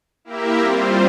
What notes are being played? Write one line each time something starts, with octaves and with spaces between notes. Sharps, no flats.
A#3 E4 G4 A#4 E5
G3 C4 F4 C5